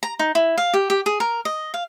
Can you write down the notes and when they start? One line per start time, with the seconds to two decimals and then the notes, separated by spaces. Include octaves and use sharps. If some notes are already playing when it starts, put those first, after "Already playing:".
0.03 A#5
0.19 D#4
0.35 E4
0.58 F5
0.74 G4
0.90 G4
1.06 G#4
1.20 A#4
1.45 D#5
1.74 F5